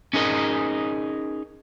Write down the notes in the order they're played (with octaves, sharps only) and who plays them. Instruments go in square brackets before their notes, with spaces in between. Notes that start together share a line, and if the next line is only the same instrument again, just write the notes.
[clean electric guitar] C#4 D#4 G#4 A#4 D#5